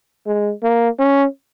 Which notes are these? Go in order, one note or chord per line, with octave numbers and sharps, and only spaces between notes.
G#3
A#3
C#4